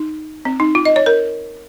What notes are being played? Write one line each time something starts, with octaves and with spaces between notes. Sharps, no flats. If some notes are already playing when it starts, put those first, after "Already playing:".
Already playing: D#4
C4
D#4
F4
D#5
C#5
A#4